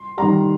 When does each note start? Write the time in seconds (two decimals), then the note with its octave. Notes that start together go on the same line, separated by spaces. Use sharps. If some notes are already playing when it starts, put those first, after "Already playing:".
Already playing: C6
0.17 D#3 G3 A#5